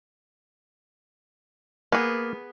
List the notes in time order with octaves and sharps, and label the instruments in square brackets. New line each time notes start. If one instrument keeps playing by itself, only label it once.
[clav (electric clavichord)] A#3 [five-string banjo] B3 G#4